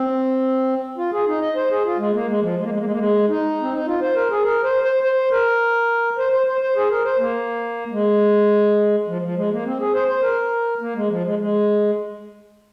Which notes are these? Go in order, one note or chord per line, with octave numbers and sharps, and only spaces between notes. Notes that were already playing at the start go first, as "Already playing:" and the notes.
Already playing: C4
F4
G#4
D#4
D#5
C5
G#4
F4
G#3
A#3
G#3
F3
G#3
A#3
G#3
A#3
G#3
A#3
G#3
D#4
C4
D#4
F4
C5
A#4
G#4
A#4
C5
C5
C5
A#4
C5
C5
C5
C5
G#4
A#4
C5
A#3
G#3
F3
F3
G#3
A#3
C4
G#4
C5
C5
A#4
A#3
G#3
F3
G#3
G#3